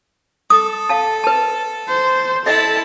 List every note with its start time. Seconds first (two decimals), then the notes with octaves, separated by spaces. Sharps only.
0.50 A4 D#6
0.89 F5 A5
1.24 B4 A5
1.88 C5
2.46 E4 A4 D#5 E5 A5